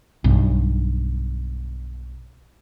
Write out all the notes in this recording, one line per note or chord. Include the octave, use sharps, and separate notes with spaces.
B1 G2